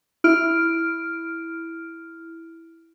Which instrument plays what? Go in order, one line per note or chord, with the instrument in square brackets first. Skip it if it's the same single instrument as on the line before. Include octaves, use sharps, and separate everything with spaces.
[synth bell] E4 F6 D7